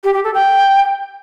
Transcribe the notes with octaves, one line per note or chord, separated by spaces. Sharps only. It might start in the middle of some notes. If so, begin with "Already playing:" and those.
G4
G4
A4
G5